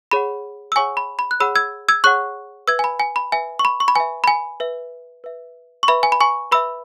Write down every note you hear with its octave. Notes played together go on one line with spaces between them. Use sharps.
G#4 C#5 F#5 B5
E6
G#4 C#5 F#5 G#5 C#6
B5
B5
F#6
G#4 C#5 F#5 B5 E6
E6 G#6
E6 G#6
G#4 C#5 F#5 C#6 F#6
B4 E5 E6 G#6
G#5
B5
G#5
B5
B4 E5 G#5
C#6
B5
C#6
B5
B4 E5 G#5
B5
G#5
B4 E5
B4 E5
C#6
B4 E5 B5
G#5
B5
G#5 C#6
B4 E5 B5 E6